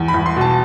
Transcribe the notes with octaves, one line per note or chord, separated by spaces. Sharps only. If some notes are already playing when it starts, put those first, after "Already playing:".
Already playing: E2
B5
E2
C6
B2 A5